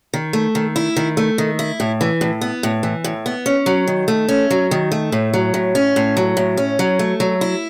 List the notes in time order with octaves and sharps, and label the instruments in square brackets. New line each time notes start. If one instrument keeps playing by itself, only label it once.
[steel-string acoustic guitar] D#3
A3
D#3
E4
D#3
A3
D#3
E4
A2
E3
A2
B3
A2
E3
A2
B3
C#4
F#3
D#3
A3
C#4
F#3
D#3
A3
A2
F#3
A2
C#4
A2
F#3
A2
C#4
F#3
A3
F#3
E4